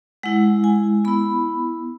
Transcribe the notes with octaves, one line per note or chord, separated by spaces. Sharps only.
G#3 E4 F#5
G#5
B3 E4 B5